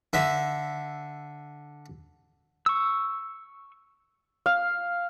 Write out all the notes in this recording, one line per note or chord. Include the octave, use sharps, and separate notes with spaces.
D3 E5
C#6 E6
F5